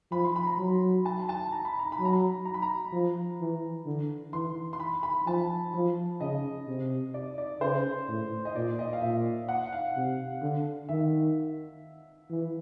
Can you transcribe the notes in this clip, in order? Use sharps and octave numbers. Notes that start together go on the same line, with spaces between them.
F3 B5
C6
B5
A#5
F#3
A5
A5
A#5
B5
A#5
B5
F#3
A#5
A#5
B5
A#5
F3
E3
D3
E3 C6
C6
B5
B5
F3 A5
F3
C#3 D#5
C3
D5
D5
C#3 C5
A2
D#5
A#2 D5
D#5
F5
A#2 E5
F#5
F5
C3
D3
D#3 E5
E3